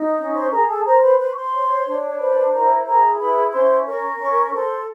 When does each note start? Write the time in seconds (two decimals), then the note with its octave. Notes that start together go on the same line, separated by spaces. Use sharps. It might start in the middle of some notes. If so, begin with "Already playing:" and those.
Already playing: D#4
0.18 C#4
0.35 C5 C6
0.52 G#4 A#4 A#5
0.68 A4 A5
0.85 A#4 C5 A#5
1.02 B4 B5
1.19 B4 C5 B5
1.32 C#6
1.36 C5 C6
1.53 C#5
1.86 D4
2.19 B4 C5 B5
2.53 E4 A#4 A#5
2.86 G#4 A#4 A#5
3.20 E4 B4 B5
3.53 C#4 C5 C6
3.87 A#4 C#5 C#6
4.20 C#4 C#5 C#6
4.42 C#6
4.53 A4 C5 C6